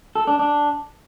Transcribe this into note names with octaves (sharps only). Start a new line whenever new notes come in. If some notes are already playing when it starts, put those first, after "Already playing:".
A4
D4
D4